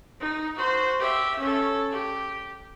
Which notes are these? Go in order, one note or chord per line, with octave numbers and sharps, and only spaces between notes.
D#4
F#4 C5
G4 E5
C#4 A4
G4